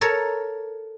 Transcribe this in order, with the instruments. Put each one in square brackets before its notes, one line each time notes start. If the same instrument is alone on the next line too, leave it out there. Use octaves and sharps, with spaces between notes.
[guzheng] A4 A#4 C#5